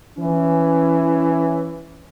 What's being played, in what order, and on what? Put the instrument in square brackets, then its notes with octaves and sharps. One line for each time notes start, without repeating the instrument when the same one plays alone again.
[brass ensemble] E3 C#4